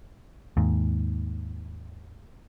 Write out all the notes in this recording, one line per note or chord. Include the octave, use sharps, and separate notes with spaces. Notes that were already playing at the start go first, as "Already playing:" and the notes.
D#2 G#2